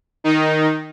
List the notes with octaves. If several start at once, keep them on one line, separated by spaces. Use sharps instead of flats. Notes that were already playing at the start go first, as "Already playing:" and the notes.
D#3 D#4